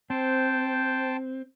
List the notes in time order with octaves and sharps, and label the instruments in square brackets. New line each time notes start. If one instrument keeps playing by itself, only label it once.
[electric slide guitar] C4 [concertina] C5 G5 A5